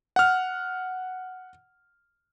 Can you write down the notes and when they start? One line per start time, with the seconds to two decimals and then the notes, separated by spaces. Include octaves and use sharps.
0.16 F#5 F6